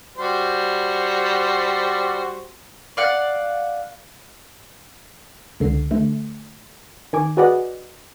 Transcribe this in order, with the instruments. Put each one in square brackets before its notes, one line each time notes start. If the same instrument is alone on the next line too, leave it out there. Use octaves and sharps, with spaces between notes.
[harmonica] G3 F#4 C5
[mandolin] D5 F5 F#5
[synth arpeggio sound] C#2 D3 C7
D3 A3
D#3 G#5 D6
F#4 G#4 B4 D5 D#5 F#5